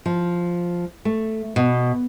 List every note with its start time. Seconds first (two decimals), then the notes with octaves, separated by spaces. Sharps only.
0.06 F3
1.05 A3
1.56 B2